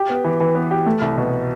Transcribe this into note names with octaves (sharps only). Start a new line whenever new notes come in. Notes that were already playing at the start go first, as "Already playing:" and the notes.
Already playing: G4
B3
E3
E3
B3
G4
A3
C2
B2